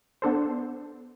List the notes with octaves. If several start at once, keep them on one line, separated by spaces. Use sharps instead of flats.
B3 D4 A4 C5